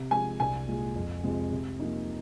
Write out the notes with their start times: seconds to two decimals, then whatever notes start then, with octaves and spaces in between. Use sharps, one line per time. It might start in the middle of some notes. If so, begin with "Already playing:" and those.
Already playing: C3
0.11 F3 G#3 G#5
0.40 C2 G#5
0.67 A#2 G#3 F4
0.95 F2
1.24 C3 G#3 C4 F4
1.52 C3
1.79 F3 A#3 D#4